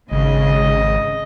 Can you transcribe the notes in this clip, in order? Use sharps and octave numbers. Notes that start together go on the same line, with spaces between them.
G#1 C#3 D#5